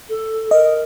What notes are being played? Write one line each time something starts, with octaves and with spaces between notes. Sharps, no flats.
A4
A#4 D#5